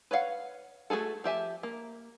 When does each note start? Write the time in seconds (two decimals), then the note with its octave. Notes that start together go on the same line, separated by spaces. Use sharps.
0.11 B4 C#5 D5 F5 F#5
0.90 A3 A#3 F#4 G#4 A4
1.24 F3 G4 E5 G#5
1.63 A#3